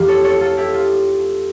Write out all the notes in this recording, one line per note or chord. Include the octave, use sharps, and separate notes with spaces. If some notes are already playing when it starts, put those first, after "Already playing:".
Already playing: F2 E3 A3 F4 G4
A4 C#5
A4 C#5
F4 A4
E4 G4
F4